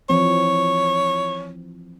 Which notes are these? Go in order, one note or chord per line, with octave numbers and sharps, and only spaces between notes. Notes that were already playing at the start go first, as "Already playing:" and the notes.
E3 F3 C4 C#5